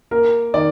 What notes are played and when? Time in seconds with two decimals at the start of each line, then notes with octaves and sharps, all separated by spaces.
0.11 A#3 A#4
0.54 D#3 D5